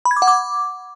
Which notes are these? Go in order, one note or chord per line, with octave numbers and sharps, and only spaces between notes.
B5
G#6
D6
F#5
D6